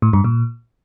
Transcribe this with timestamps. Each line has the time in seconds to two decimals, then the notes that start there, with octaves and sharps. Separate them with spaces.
0.02 A2
0.13 G2
0.24 A#2